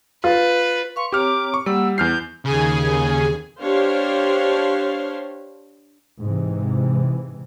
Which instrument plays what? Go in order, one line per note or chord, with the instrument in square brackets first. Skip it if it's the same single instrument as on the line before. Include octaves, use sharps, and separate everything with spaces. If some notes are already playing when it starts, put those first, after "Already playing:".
[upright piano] F4 [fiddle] B4
[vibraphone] B4 F5 C6 [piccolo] C#6
[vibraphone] C4 C#5 A#5 [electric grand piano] G4 F6 [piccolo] D6
[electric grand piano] C#6
[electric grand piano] G3 [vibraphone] A#3 F#5 [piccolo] E6
[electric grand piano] E2 F6 C7 [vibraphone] E4 [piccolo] G6
[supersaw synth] D#2 G#4 G#5 [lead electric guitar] C#3
[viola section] D4 G4 C5 C#5 F5 C6
[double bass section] G#2 C3 E3